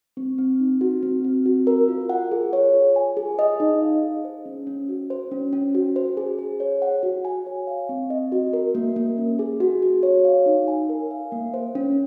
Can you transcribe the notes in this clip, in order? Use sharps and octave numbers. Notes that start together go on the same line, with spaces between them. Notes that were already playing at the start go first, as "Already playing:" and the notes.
C4
C4
D#4
F#4
C4
C4
F#4
A#4
F4
F#5
G#4
C#5
F4
G#5
G#4
D#5
D#4
F5
G#4
C5
C#4
C#4
F#4
C5
C#4
C#4
F#4
C5
G#4
G#4
C#5
F#5
F#4
G#5
C#5
F5
C4
D#5
F#4
A#4
A#3
A#3
C#4
G#4
F#4
F#4
C#5
F5
D#4
G#5
A#4
F5
A#3
C5
C#4